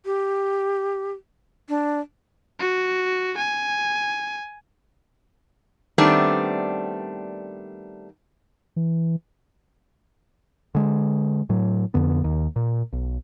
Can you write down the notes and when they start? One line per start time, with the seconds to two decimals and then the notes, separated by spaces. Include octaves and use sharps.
0.05 G4
1.69 D4
2.59 F#4
3.37 G#5
5.98 D#3 G3 A3 B3 C4 D4
8.76 E3
10.75 D3 G#3
11.49 A2 F#3
11.94 F2 D3 B3
12.24 D#2 D#3
12.56 A#2
12.93 B1